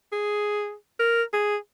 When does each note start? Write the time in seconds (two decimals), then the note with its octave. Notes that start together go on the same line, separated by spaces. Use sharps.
0.12 G#4
1.00 A#4
1.33 G#4